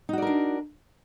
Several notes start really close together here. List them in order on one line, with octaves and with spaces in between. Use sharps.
D#4 F#4 D5 A#4 D4